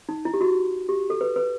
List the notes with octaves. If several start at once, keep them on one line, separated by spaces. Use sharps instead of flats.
D#4
E4
G4
F#4
G4
A4
B4
B4